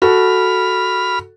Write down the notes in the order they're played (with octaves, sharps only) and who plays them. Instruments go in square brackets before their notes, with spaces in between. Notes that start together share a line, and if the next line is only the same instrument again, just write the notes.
[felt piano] F#4 A4 [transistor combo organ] B5 F6